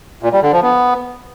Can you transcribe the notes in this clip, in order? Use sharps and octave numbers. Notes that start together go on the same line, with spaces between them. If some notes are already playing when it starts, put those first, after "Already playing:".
A#2
G3
D3
F3
B3